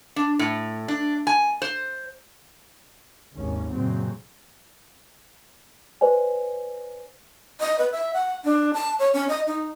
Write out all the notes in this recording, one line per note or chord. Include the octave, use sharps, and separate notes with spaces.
D4
A2
D4
G#5
C5
G#1 D#2 C#4
F#2 A#2 C#3 F#3 C4
B4 C5 D5 G#5
D#5
B4
E5
F#5
D4
A5
C#5
C#4
D#5
D#4